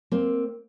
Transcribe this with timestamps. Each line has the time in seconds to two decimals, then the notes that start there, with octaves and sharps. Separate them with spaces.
0.12 A#3 C4